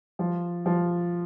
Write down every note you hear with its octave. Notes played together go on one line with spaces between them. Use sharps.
F3
F3